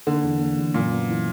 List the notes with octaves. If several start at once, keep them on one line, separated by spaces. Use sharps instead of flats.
D3 A#3
E2
A#3
E2
F#2 A#2
B3
E3